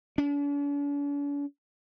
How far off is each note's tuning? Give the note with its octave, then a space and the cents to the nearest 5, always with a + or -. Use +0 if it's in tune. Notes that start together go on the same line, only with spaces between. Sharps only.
D4 -45